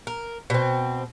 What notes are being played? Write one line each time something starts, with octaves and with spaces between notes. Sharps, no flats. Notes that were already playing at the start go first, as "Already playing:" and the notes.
A#4
B2 C4